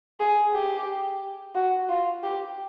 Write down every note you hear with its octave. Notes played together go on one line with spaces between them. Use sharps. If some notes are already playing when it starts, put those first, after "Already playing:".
G#4
G4
F#4
F4
G4